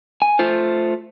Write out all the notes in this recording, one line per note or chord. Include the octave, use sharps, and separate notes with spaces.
G#5
A3 F4 C5